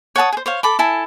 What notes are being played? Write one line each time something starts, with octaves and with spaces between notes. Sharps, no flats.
C#5 F#5 A5 D#6
G#4 C5
C5 C#5 F5
A4 B5 D6
E4 A4 G#5 A5